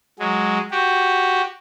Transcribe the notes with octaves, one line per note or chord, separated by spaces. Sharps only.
F#3 G#3
F#4 G4